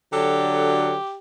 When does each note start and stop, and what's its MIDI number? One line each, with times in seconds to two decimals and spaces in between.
0.13 0.96 50
0.13 0.94 54
0.13 1.17 67
0.13 0.94 69